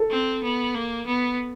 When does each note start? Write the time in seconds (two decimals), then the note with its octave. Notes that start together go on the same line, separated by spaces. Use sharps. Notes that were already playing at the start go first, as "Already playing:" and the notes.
Already playing: A4
0.10 C4
0.43 B3
0.75 A#3
1.07 B3